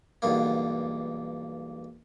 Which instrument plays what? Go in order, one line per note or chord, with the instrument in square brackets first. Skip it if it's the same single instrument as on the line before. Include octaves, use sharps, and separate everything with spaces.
[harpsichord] B1 E2 G2 A#3